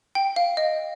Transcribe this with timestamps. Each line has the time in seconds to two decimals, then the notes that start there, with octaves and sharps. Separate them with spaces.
0.15 G5
0.36 F5
0.57 D#5